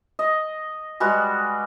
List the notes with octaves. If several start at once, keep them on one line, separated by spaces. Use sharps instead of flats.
D#5
G3 G#3 F#4 B4